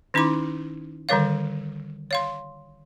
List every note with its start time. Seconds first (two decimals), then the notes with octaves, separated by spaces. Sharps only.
0.14 D#3 C#4 D#4 E4 C6 D6
1.09 D3 D#3 G3 A#4 C#5 F5
2.11 C#5 F5 C6